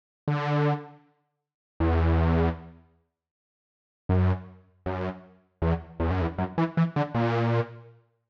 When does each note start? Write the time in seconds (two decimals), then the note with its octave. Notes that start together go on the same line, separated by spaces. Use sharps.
0.28 D3
1.80 E2
4.09 F#2
4.86 F#2
5.62 E2
6.00 E2
6.11 F#2
6.21 E2
6.38 F#2
6.58 E3
6.77 E3
6.96 D3
7.15 A#2